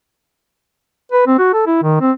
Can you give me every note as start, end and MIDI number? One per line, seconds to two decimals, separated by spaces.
1.12 1.25 71
1.27 1.38 60
1.39 1.53 66
1.54 1.66 69
1.67 1.81 64
1.82 1.96 51
2.01 2.12 60